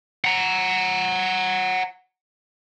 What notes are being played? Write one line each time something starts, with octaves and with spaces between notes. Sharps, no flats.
F#5 A#5